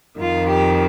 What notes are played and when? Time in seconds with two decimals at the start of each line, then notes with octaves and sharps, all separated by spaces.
0.20 F2 D#3 F4
0.49 G4